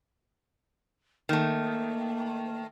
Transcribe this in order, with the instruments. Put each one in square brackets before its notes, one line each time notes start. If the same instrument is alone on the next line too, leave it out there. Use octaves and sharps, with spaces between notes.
[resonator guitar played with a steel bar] D#3 A3 [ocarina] A#3